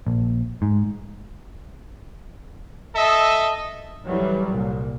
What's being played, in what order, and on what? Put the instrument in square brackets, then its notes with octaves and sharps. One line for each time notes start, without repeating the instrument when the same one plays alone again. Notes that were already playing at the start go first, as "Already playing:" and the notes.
[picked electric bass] A#1
G#2
[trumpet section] A4 D#5 E5
[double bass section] F2 E3 F#3 G3
C2 A#2